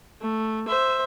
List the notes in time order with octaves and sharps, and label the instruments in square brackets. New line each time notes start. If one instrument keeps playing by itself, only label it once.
[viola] A3
C5 E5